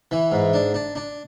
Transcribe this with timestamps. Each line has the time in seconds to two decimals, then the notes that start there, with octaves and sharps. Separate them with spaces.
0.11 E3
0.32 G#2
0.53 D4
0.74 D4
0.95 D4